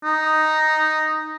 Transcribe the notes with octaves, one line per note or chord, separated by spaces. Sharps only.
D#4